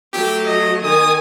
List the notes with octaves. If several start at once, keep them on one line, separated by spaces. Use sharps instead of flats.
F#3 A3 G4
D#5
D#3 G#5 D#6